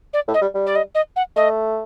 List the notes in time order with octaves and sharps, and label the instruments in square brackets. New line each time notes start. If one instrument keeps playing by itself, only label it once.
[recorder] D5
[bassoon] A2
[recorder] D#5
[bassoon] G3
G3
[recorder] D5
D#5
D#5
F#5
[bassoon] A3 [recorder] D#5